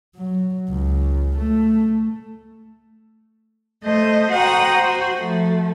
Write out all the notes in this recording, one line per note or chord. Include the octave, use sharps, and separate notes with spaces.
F#3
C#2
A3
A3 C5 D#5
F#4 C5 F#5 G5 A#5 D#6
F#4 C5
F3 A3